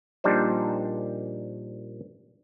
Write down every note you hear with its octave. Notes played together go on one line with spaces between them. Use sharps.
A#1 A#2 G3 D4 D#4 C5